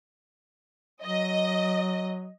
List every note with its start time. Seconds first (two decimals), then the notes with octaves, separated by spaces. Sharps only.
1.04 F#3 D#5